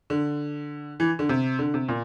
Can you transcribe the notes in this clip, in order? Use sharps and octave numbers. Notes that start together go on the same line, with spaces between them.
D3
E3
D3
C3
D3
C3
A#2